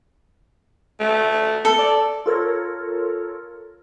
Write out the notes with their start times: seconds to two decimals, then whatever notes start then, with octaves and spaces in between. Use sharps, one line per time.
1.00 A3
1.65 A4
1.78 D5
2.26 F4 A4 A#4 C#5